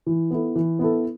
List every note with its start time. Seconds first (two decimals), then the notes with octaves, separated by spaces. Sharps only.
0.06 E3
0.31 B3 E4 A4
0.55 E3
0.79 B3 E4 A4